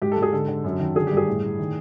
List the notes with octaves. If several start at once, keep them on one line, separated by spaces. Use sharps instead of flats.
G#2 G4
A4
G#2
G#4
D3 A4
D3
F#2
D#3
D3 G#4
G2 G4
G#4
A2
A2
D#3